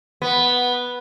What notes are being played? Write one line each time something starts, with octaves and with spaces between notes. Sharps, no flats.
B3